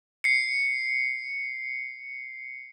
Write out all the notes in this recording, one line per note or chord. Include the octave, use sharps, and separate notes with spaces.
C7 C#7